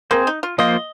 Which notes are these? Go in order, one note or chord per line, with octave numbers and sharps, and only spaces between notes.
A#3 C4 G#4 C5
D#4
F4
F3 A#3 F4 C5 D#5